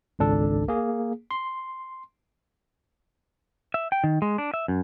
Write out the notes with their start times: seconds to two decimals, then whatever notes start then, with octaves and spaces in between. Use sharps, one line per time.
0.19 G#1 C#2 D4 A4
0.68 A#3 G#4
1.31 C6
3.74 E5
3.92 G5
4.04 D#3
4.22 G#3
4.38 D4
4.54 E5
4.68 F#2